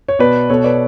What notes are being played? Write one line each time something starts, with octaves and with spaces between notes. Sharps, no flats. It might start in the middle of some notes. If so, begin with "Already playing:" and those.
C#5
B2 B4 D5
B2 A4 C#5
B4 D5